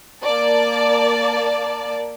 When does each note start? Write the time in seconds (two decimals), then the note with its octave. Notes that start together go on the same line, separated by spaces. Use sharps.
0.22 A#3 D5 A5